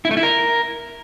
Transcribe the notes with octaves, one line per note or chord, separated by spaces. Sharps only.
E4
A3
E4
A#4